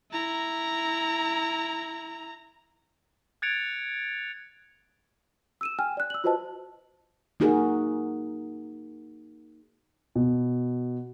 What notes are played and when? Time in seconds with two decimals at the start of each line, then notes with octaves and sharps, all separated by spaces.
0.12 E4 A#5
3.42 F#6 G#6 A6 C#7 D7 F7
5.61 E6 D#7 E7
5.79 G5 G#5 F6
5.97 D5 F#6
6.10 E6 F#7
6.24 F4 F#4 B4 C5 D#5 A5
7.40 A#3 D#4 F#4 G#4 A#4
10.15 B2